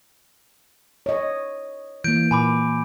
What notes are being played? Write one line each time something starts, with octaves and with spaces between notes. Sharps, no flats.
C#5 D#5
E3 A#3 G6 D7
A#2 G#5 B5 D6